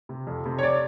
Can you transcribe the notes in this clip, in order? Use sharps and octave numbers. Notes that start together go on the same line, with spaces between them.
C3
F2
C3
C#5
D5